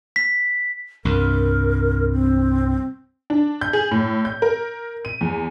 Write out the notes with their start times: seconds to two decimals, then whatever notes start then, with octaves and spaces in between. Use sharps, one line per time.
0.16 B6
1.05 C2 G2 A#4
2.13 C4
3.30 D4
3.61 G6
3.73 G#4
3.91 A2
4.25 G6
4.42 A#4
5.05 D#7
5.21 E2